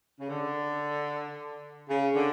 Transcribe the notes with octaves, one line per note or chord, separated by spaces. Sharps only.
C#3
D3
C#3
D3